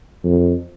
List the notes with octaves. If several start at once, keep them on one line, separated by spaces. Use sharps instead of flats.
F2